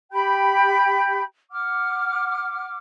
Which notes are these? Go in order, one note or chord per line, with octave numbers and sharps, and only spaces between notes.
G4 G5 B5 G6
F#5 D6 F6